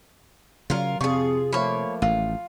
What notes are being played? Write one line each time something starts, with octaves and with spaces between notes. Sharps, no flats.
C#3 F3 F#3 F4 A#4
F2 C3 F4 G#4 C#6
F3 A3 A#3 C#5 B5
A1 F4